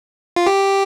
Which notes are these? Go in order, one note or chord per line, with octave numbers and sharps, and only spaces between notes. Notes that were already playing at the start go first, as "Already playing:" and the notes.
F4
G4